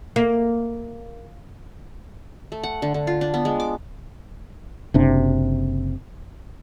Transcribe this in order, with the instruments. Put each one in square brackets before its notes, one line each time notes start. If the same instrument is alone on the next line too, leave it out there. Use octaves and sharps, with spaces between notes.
[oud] A#3
[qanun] A3
F#5
D3
D3
F4
D4
B3
G#3
D6
[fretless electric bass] F#1 C3 D4